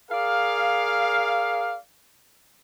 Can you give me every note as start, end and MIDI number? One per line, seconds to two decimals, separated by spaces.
0.11 1.76 68
0.11 1.76 70
0.11 1.76 74
0.11 1.76 77